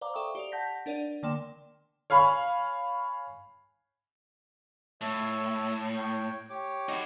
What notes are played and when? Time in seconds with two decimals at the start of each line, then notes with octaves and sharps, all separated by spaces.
0.01 C5 D5 F5 A#5 D6
0.14 A4 E5 G5 A#5 C#6 D#6
0.35 G4 D5 F7
0.52 F#5 A5 G6 A#6 B6
0.86 D4 A#4 D5 F#5 D#7
1.23 D3 A#3 D5 G5 C6 E7
2.10 C#5 F5 G#5 B5 C#6
5.01 A2 C#5 E5
5.94 C#5 G5
6.50 G4 C#5 D6
6.89 D#4 F#4